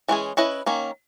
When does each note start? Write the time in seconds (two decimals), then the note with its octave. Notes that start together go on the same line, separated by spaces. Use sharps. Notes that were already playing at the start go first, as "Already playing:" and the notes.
0.08 E3 G#3 C#4 G#4
0.37 C#4 E4 B4 D#5
0.66 D#3 A#3 C#4